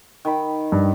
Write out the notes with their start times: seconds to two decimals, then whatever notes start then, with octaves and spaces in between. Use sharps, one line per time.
0.25 D#3 B5
0.72 G2